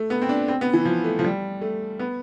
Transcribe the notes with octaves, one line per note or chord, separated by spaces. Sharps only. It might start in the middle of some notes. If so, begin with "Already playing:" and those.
Already playing: A3
B3
C4
D4
C4
B3
E3
F3
A3
F3
G3
A3
B3